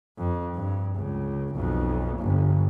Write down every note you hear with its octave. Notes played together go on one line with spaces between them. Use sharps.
F2
G2
C#2
B1 F2
G1